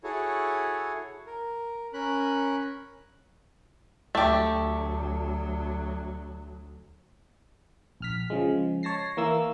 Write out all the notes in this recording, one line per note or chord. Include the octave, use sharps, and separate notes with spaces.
E4 F#4 G#4 A4 C#5
A#4
C#4 A#4 B5 F#6
D2 F#3 A3 G4
A#1 F6 B6
C#3 F3 G#3
C#5 A5 A#6 C7
E3 A#3 E6